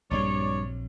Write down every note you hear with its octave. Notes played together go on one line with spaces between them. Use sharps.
A#1 G2 F#3 C4 C#5 D5